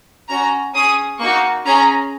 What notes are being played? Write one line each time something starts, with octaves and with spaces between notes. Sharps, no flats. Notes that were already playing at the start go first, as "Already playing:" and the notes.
C#4 F#4 A#5
C#4 G#4 D#6
A#3 D#4 F#4 C#6
C#4 G#4 A#5